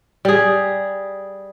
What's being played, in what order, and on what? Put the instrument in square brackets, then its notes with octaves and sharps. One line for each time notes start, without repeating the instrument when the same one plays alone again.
[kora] G3 G#4